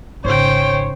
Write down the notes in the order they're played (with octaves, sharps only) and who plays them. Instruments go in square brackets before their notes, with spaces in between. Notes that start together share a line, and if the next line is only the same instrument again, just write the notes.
[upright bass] G#1 [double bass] C#3 [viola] C5 G5 [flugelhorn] C#5